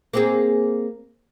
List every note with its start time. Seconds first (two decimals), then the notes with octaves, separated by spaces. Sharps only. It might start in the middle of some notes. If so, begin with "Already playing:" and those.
0.14 A#3 C4 G#4